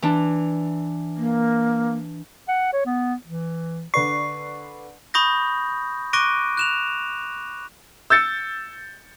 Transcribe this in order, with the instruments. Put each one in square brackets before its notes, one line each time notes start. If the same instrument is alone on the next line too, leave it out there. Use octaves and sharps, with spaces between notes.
[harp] E3 D4
[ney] A#3
[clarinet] F#5
C#5
B3
E3
[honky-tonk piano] D3 B4 D5 [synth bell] C#6 C7
[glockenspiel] B5 C#6 D#6 G6 A#6
C#6 D6 F#6 A#6 D7 D#7
F#6 E7 F7
[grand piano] E6 G6 A6 C#7